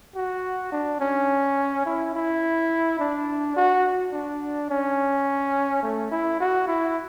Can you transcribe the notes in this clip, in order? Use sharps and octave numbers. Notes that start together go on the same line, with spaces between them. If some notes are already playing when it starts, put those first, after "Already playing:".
F#4
D4
C#4
E4
E4
D4
F#4
D4
C#4
A3
E4
F#4
E4